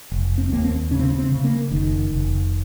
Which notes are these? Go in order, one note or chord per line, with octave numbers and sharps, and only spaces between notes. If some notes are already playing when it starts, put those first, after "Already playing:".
F1
C4
D#2 A#3
C4
C#3 C#4
C4
C#4
C4
C#3
A#3
F1 D#3
F1